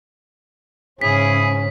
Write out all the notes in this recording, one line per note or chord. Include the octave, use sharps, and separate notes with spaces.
G#2 C#3 C#4 E4 G#4 B6